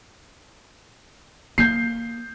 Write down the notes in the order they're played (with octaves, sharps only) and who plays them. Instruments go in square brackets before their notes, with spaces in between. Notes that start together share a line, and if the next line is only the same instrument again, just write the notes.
[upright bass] A#3 [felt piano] G6 C7